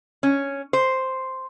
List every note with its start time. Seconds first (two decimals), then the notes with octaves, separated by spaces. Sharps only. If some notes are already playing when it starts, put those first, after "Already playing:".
0.23 C#4
0.73 C5